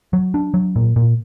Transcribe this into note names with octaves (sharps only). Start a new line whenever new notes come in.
F#3
D4
F#3
A#2
A#2